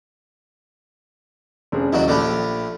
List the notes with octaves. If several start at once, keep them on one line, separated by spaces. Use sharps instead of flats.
F1 C#4 D4 G#4 A4 B4
D#2 F#3 D4 E4 F#4 D#5
A#1 A3 D4 G4 B5 D6 F6